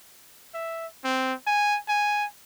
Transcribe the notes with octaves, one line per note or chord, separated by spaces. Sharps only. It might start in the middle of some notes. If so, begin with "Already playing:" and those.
E5
C4
G#5
G#5